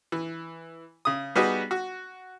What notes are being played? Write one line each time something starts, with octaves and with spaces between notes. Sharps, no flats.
E3
C#3 D#6
G3 B3 D#4 F#4 G#4 B4
F#4